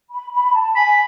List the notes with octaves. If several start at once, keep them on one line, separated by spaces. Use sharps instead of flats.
B5
B5
A5
G#5 B5